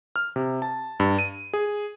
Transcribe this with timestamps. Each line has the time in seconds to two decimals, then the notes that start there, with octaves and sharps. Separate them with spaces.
0.16 F6
0.36 C3
0.62 A5
1.00 G2
1.19 D#7
1.53 G#4